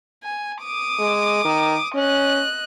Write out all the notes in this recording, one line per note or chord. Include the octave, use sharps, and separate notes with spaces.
G#5
D6 D#6
G#3
D#3
C#4 D#5 F#6